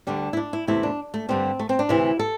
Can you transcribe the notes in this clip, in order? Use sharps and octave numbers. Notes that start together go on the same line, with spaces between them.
D2 D3 G3 D4
E4
D4
E4
E2 C3 A3 E4
D4
A3
G2 D3 G3 C4
A3
C4
D4
D2 C3 E3 E4
A4